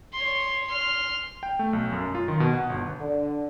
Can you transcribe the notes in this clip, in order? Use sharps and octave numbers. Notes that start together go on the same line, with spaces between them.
C#5 C6
C6 F6
G5
A3
B1
F#2
F4
D#3
B2
F#5
G1
D3